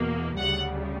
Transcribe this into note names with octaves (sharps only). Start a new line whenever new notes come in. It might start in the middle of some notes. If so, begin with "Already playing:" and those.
Already playing: E2 B2 A#3
D2 C#3 G3 F#5